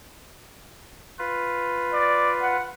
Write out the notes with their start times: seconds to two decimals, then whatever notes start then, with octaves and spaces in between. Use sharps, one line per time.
1.19 F4 B4
1.94 D5
2.42 F#5